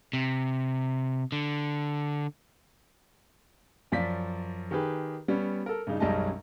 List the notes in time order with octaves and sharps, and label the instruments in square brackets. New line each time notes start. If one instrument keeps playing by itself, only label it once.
[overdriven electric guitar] C3
D3
[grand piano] F#2 F3 D5 B6
D#3 G4 G#4 B4
G3 B3 C#4
A4 A#4
G2 C#3 D#4
B1 F#2 G3 G#3 D#5 A5